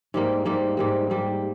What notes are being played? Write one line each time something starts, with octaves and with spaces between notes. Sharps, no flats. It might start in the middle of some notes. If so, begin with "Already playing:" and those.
G#2 G3 A#3
G#2 G3 A#3
G#2 G3 A#3
G#2 G3 A#3